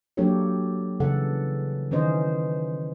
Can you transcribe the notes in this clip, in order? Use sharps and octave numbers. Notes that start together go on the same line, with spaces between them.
F#3 A#3 D4 G4 A4 C#5
C#3 E3 G3 A4 F#5
D#3 E3 C#4 C5 D#5